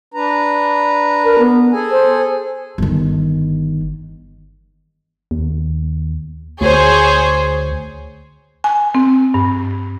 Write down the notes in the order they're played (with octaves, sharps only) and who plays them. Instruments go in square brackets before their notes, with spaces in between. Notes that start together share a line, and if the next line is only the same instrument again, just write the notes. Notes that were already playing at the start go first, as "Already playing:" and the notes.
[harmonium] D4 B4 A#5
[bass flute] A#4
B3
[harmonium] G#4 A4 G#5
[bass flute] C5
[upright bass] G1 D#3
[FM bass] D#2
[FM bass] D2 [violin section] G#4 C5 C#5
[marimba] G#5
C4
G2